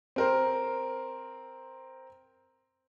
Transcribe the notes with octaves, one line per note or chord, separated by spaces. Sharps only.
C4 A#4 C5